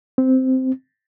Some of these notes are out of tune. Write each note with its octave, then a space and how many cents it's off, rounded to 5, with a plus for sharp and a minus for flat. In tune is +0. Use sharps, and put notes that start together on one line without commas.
C4 -10